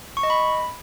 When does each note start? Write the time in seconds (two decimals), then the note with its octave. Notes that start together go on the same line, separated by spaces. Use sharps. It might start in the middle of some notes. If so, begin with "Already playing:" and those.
0.17 C#6
0.23 D#5
0.30 B5